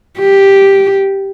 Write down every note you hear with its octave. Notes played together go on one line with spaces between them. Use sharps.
G4